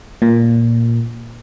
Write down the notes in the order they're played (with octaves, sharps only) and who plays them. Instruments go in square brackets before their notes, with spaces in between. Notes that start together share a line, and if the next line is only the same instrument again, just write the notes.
[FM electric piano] A#2